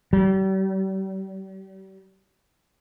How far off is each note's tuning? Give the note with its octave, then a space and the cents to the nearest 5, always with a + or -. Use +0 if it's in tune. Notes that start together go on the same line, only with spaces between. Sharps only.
G3 -40